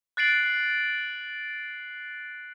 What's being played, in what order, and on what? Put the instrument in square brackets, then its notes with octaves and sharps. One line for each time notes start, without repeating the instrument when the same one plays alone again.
[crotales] F#6 A6 C7 D7 F#7